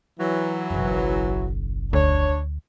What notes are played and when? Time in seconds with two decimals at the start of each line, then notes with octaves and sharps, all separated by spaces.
0.19 E3 F#3
0.70 F#1 B1
1.93 D2 D4 C#5